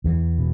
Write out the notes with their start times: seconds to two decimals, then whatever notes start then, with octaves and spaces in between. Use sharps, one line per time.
0.04 E2 E3
0.38 B2